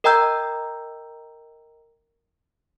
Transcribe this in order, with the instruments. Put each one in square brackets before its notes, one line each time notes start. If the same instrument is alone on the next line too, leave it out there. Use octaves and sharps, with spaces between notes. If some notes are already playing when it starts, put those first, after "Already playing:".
[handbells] A#4 D#5 G5 A#5 E6 G6